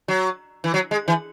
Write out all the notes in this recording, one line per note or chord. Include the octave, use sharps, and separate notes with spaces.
F#3
E3
F#3
G#3
E3